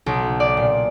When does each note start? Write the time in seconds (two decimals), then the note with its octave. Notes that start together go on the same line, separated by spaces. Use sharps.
0.06 B1
0.40 D5
0.57 A#2